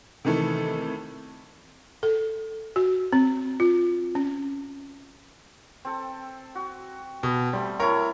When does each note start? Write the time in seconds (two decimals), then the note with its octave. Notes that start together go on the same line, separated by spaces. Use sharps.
0.25 C3 D#3 E3 A3
2.03 A4
2.76 F#4
3.13 C4
3.60 F4
4.15 C#4
5.85 C4 A4
6.55 F#4
7.23 B2
7.53 G3 A3 C4
7.80 A3 E4 A4 A#4 C#5 C#6